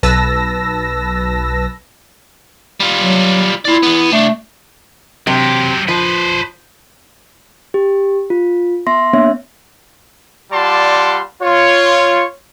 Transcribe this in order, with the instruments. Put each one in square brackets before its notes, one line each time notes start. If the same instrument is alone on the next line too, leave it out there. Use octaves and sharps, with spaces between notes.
[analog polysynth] B1 B4 A5 E6 A#6
[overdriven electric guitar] G3 F4
[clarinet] F#3
[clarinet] E4 [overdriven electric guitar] F4 D5
[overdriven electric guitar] E2 B3
[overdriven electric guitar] C2 D4 [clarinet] A3
[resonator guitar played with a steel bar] C3 [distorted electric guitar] F#3 G4
[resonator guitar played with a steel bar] F3 [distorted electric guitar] B4 C5
[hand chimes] G4
F4
B3 E5 C6 A#6
A#3 B3 D4 C#5 E5
[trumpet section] G3 F4 D5 F#5 A5 C6
F4 C#5